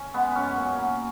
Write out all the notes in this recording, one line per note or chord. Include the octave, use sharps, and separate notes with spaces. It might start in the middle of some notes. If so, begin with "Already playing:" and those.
Already playing: C#4
G#3 B3
F#2 C#4
A#2
F#3